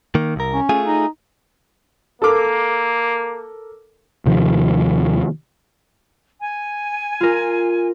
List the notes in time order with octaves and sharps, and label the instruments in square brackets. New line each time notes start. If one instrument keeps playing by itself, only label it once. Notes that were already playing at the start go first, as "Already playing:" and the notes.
[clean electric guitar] D#3 A#3
C2 A#4
[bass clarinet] C#4
[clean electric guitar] A3 F4 G#4
[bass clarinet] D#4
[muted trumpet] A#3 [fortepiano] A4 A#4 D6
[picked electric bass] D#2 C3 D#3 F3
[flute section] G#5
[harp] F4 A#4